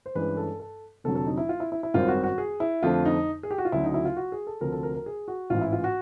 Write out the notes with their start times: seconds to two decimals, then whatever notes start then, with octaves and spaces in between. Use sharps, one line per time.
0.06 C5
0.15 G2 E3 G#3 C#4 B4
0.37 A4
0.60 A4
1.04 F1 F2 D3 F#3 A4
1.15 A4
1.27 D#4
1.38 E4
1.49 F4
1.60 E4
1.72 E4
1.83 E4
1.94 G#1 F#2 D#3 G3 C4 F4
2.08 F#4
2.24 F#4
2.38 G#4
2.60 E4
2.83 F2 D3 F3 A3 F4
3.05 D#4
3.43 G#4
3.51 G4
3.58 F#4
3.65 F4
3.72 D2 C#3 F#3 E4
3.84 D#4
3.94 E4
4.05 F4
4.17 F#4
4.32 G#4
4.47 A4
4.61 D2 C3 F3 A#4
4.72 A4
4.83 A#4
4.94 A#4
5.06 G#4
5.28 F#4
5.50 A1 G#2 E3 F4
5.61 E4
5.72 F4
5.84 F#4